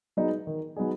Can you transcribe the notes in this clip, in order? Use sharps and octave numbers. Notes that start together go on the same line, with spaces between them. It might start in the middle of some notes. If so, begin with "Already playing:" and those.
F#3 B3 D#4 G#4
D#3
F#3 B3 D#4 G#4